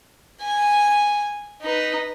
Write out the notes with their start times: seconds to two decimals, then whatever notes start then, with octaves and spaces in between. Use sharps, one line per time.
0.42 G#5
1.62 D#4 B4